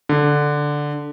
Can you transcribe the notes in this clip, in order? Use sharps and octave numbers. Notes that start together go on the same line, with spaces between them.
D3